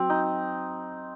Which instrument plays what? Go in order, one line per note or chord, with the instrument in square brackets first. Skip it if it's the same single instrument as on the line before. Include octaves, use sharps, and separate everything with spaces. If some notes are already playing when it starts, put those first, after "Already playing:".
Already playing: [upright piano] F#3 [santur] C4
[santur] D#4